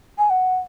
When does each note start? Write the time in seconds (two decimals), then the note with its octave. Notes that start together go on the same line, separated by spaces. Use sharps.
0.18 G#5
0.30 F#5